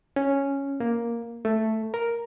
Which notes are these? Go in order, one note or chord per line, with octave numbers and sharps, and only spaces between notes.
C#4
A#3
A3
A#4